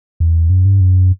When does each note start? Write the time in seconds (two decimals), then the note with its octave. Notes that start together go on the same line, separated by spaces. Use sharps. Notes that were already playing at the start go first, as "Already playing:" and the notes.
0.20 E2
0.50 F#2
0.65 G2
0.80 F#2